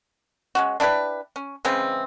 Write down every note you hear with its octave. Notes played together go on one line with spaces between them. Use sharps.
G#3 C#4 F#4
D4 E4 G4 B4
C#4
C#3 E3 G#3 C4